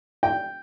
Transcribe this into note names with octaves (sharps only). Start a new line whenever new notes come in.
G5